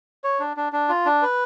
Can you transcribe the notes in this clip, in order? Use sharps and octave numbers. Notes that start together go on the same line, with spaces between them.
C#5
D4
D4
D4
F4
D4
B4